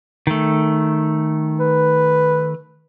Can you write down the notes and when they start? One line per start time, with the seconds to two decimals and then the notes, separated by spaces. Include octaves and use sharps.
0.27 D#3 A3
1.60 B4